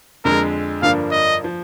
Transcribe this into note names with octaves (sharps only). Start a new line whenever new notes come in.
F2 D3 G#3 A#4
G2 D3 F3 A#3 D4 F5
D#5
F3